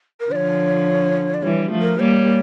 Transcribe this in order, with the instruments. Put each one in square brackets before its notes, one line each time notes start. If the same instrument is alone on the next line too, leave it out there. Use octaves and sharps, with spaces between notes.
[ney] A#4
[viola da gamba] D3 F3 [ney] D5
[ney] C#5
D5
[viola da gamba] E3 G3 [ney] C#5
[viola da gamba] F3 A3
[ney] A#4
[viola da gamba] G3 A#3 [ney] C#5